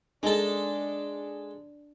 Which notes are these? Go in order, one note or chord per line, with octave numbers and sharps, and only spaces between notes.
G#3 D4 D#4 A4 A5